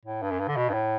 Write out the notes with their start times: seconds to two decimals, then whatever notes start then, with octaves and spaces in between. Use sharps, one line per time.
0.06 A2
0.22 G2
0.31 F#2
0.40 G2
0.48 D3
0.57 B2
0.69 G2
0.74 A2